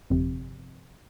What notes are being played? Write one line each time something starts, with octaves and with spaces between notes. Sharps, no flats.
G1 F2 C3